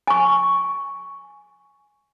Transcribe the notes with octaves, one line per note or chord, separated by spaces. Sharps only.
G#5 C#6